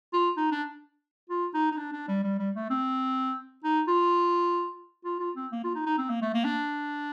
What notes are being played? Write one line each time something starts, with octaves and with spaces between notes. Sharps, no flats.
F4
D#4
D4
F4
D#4
D#4
D4
D4
G3
G3
G3
A3
C4
D#4
F4
F4
F4
C4
A#3
F4
D#4
D#4
C4
A#3
A3
A#3
D4